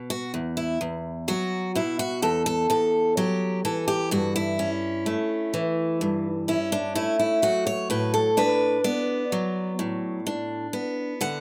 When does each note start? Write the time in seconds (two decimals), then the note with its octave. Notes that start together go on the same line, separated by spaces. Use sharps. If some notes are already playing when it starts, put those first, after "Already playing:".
Already playing: B2
0.10 F#4
0.34 E2
0.57 E4
0.81 E2
1.28 F#3 F#4
1.75 B2 E4
1.99 F#4
2.22 E2 A4
2.46 A4
2.70 E2 A4
3.17 F#3 G4
3.65 E3 A4
3.88 G4
4.11 G2 F#4
4.36 E4
4.59 C#4
5.06 A3
5.54 E3
6.01 G2
6.48 C#4 E4
6.72 D4
6.95 A3 E4
7.19 E4
7.42 F#3 F#4
7.67 C#5
7.90 A2 B4
8.14 A4
8.37 D4 B4
8.84 B3 D5
9.32 F#3
9.79 A2
10.27 D4
10.73 B3
11.21 D3 F#5